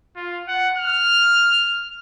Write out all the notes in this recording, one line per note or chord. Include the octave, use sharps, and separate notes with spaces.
F4
F#5
F6